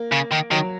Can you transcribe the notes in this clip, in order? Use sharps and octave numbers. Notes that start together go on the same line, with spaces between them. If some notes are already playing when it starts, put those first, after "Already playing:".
Already playing: A#3
C#3
D#3
D#3 F#3